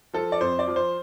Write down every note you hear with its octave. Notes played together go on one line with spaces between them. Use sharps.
F3 A4
D5
F2 C5
D5
F3
C5